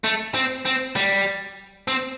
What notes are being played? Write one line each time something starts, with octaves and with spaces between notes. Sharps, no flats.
A3
C4
C4
G3
C4